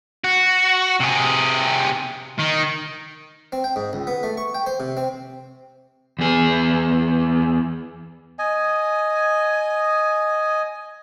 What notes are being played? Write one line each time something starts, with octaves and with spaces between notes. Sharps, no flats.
F#4
C3 G#4
D#3
C4
G5
G#2
C#2
B3
A3
C#6
G5
C5
C3
C4
E2 G#4
D#5 G#5